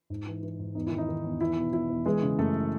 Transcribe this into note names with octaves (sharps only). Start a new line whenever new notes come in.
G#2
E3
E3
G#2
E2 D#4
E4
D#3
D#4
D#3
E2
E2 E4
B2
B2 E4
E2
E3 G#3 G#4
C#3
F#2 A3 A4